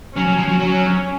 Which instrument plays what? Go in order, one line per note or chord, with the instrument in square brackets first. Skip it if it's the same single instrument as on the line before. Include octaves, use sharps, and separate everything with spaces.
[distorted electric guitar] F#3 [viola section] C#4
[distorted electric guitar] F#3
F3
F#3
[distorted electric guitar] F#3 [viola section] C#4